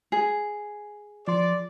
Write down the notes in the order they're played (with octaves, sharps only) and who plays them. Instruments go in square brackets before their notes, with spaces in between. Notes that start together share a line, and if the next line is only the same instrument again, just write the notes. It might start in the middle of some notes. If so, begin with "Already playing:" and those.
[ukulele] G#4
[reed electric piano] F3 C6 [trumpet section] D5